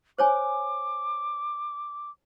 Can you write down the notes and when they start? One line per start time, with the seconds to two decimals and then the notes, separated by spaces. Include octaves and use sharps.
0.18 C5 C#5 G#5 D6